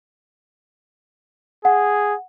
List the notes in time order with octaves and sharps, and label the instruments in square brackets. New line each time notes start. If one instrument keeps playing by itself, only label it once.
[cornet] G#4 [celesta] F#5